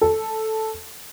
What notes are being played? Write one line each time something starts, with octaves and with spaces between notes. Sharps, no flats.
A4